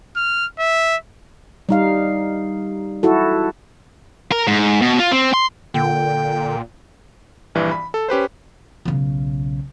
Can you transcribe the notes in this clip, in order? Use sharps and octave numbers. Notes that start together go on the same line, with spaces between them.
F6
E5
G3 D#4 F5
E4 F#4 A4
A#4
G#2
B2
F4
C4
C6
A#2 D3 G5
A#1 G2 E3
B5
A4
C#4 G4 B4 C5
B1 C#3